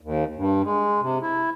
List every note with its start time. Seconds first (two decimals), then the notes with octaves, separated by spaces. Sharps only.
0.01 D#2
0.37 G2
0.63 G#3
1.01 C3
1.22 E4